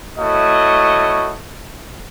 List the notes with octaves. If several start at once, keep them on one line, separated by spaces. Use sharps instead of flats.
A3 E4 F#4 C#5 D#5